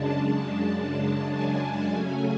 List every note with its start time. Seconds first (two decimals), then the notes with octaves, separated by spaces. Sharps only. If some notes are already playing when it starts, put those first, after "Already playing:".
Already playing: F#2 C#3 G#3 D4 A5
0.19 A5
1.33 G#5
1.91 C#3 F#3 A3 C#4 G#5